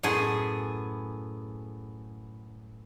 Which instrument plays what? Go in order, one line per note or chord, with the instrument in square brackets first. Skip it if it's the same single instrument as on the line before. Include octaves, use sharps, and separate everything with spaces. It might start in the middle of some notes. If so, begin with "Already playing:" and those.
[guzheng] F#2 A2 B3 G#4 G#5 C6